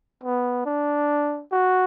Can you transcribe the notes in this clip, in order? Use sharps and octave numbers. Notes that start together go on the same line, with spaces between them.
B3
D4
F#4